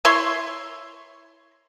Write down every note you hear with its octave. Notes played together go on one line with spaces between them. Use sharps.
E4 C#5 C6